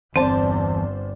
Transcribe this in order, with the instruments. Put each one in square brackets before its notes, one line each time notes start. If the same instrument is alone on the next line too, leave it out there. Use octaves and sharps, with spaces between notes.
[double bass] G1 [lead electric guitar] E2 A5 [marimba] C4 [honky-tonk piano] C5 D5